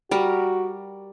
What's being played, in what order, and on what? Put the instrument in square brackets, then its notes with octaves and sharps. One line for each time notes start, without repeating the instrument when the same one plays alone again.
[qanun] G3 A#4 [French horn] F#4